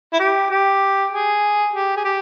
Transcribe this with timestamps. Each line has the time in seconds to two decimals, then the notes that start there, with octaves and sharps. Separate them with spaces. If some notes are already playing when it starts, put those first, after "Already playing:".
0.13 E4
0.19 G4
0.51 G4
1.12 G#4
1.73 G4
1.96 G#4
2.04 G4